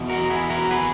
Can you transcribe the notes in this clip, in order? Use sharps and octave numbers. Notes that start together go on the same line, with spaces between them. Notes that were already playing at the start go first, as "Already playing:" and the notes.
Already playing: E2 B2
F#4 A#4
E4 G#4
F#4 A#4
G#4 B4